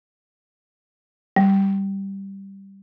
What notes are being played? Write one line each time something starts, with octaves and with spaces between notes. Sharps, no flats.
G3